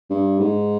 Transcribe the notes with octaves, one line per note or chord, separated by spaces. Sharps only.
G2
G#2